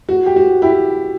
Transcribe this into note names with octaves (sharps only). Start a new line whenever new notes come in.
F#4
G4
F#4
E4 G4